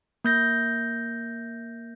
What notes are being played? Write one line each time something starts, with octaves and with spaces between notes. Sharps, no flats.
A#3 G6 A#6